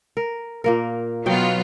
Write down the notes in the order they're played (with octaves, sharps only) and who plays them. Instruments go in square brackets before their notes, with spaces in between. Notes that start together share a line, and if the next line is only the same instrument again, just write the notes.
[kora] A#4
A#2 A#3 A#4
[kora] B2 D#4 G5 [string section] F#3 B3 F4